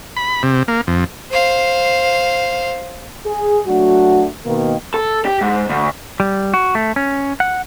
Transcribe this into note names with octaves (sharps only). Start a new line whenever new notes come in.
B5
C3
A#3
F2
C5 F5
G#4
F#3 A3 D4 F#4
B2 D#3 A#3
A4
G4
G#2
D2
G3
F#4
A3
C#4
F#5